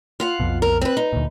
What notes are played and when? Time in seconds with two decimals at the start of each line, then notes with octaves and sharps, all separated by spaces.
0.20 F4 F5 F#5
0.40 B1 F2 B2
0.62 A#4
0.81 C4 B4
0.97 D#4
1.13 D2 A#2